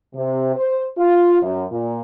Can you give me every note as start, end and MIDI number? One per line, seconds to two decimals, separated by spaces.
0.15 0.54 48
0.56 0.85 72
0.98 1.39 65
1.42 1.65 42
1.71 2.00 46